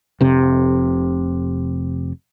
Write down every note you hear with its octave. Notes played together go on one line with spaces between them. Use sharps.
F1 C3